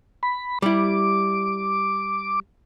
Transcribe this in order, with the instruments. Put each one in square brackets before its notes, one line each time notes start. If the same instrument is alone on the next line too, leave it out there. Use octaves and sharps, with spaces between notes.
[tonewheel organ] B5
[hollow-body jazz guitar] G3 E4 [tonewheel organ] D6